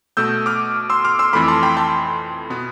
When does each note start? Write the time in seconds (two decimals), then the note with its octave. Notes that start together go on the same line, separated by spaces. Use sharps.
0.17 B2 A3 E6 G6
0.46 D6 F6
0.90 C6 E6
1.05 D6 F6
1.19 C6 E6
1.33 F2 E3 A3 B5 D6
1.48 A5 C6
1.63 G5 B5
1.77 A5 C6
2.50 B2 B3